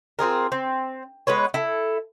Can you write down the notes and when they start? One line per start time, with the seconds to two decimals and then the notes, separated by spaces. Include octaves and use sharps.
0.19 C4 F4 G#4 A#4
0.52 C4
1.27 G#3 B3 B4 C#5
1.54 E4 A4